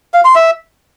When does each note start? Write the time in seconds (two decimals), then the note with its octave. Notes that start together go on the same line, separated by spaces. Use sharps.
0.14 F5
0.25 C6
0.35 E5